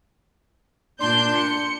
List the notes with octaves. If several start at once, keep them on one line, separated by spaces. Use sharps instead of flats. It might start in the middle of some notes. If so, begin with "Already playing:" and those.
A#2 D4 C6 G6
C#7